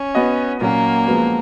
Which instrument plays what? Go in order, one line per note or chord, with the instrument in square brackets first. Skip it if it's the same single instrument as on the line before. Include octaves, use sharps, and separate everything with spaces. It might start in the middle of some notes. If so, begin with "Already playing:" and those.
Already playing: [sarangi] C#4
[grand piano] B3 F#4 B4 D#5
[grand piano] A#2 F#3 C#4 F#4 [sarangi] A#3
[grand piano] F3 G#3 B3 F#4 B4